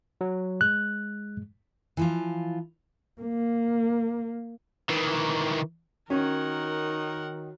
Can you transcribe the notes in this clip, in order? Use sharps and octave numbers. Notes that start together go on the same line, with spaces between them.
F#3
G#3 F#6
E3 F3 F4
A#3
D#3 E3
D#3 C#4 F#4 A#4 C#5 F#5